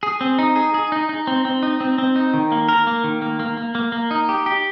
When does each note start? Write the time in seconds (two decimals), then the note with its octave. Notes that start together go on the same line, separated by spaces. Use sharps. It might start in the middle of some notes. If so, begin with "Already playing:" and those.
0.03 G#4
0.21 C4
0.39 D#4
0.56 G#4
0.74 G#4
0.92 D#4
1.09 D#4
1.27 C4
1.45 C4
1.63 D#4
1.81 C4
1.98 C4
2.16 D#4
2.34 D#3
2.52 A#3
2.69 A#4
2.87 A#3
3.04 D#3
3.22 A#3
3.40 A#3
3.57 A#3
3.75 A#3
3.92 A#3
4.11 D#4
4.29 G4
4.46 G4